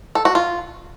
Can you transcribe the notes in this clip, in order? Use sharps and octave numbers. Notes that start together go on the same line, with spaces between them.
A4
F#4
F4